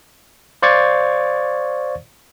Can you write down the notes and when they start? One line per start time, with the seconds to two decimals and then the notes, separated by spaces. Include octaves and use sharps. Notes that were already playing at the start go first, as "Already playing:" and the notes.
0.62 C5 D5 F5 C#6 G#6 A6